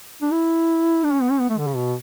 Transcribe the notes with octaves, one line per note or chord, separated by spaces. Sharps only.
D4
E4
D4
C#4
B3
C#4
B3
A3
D3
C#3
B2